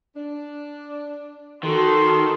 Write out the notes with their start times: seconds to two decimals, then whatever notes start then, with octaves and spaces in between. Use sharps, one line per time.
0.16 D4
1.63 D#3 F#4 A4 C6